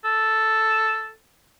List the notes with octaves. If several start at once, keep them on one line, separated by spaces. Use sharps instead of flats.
A4